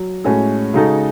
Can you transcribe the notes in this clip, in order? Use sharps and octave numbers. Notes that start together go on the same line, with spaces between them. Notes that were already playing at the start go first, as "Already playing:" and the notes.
Already playing: F#3
A2 G#3 C#4 F#4 A4
C#3 G#3 D#4 F#4 A4